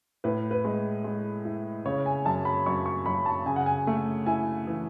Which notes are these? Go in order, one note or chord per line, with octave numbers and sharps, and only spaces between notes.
A2 B4
B4
G#3
G#3
E4
C#3 C#5
G#5
F#2 A5
B5
F#2 C#6
C#6
F#2 B5
A5
C#3 G#5
F#5
G#5
A3
E4 G#5
E3